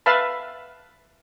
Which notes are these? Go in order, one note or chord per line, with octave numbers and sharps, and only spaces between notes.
B4 E5 F5 A5 B5